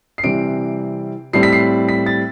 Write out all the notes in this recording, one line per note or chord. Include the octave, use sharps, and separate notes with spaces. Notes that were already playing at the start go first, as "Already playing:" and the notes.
C7
C3 E3 G3 C4 D7
A2 G3 C4 C7
B6
C7
B6
A6